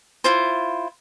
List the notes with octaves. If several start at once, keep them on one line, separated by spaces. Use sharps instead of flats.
E4 F4 C5